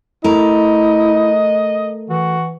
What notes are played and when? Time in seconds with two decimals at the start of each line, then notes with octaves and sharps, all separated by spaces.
0.24 A3 E4 A#4 D#5
2.10 E3 F#4